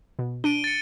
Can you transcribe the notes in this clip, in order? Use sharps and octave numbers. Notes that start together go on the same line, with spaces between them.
B2
D4 D7 D#7 G7
A6 C#7